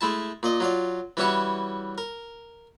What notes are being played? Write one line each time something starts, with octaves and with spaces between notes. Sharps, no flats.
G#3 A3 E4 A5
A#2 D5 D#5
F#3 F4 D5
E3 G3 C#4 E4 F#4 C#5
A#4